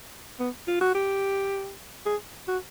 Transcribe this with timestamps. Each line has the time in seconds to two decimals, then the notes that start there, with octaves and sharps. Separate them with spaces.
0.40 B3
0.68 F4
0.81 F#4
0.95 G4
2.06 G#4
2.48 F#4